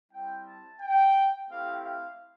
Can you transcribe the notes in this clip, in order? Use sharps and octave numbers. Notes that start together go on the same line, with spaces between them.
G3 C4 E4 G5
A5
G5
A3 C4 E4 G4 F5
F5